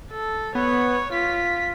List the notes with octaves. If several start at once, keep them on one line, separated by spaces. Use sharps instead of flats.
A4
B3 C#5
F4 B6